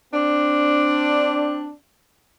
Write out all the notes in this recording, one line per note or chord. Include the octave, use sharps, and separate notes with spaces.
C4 D4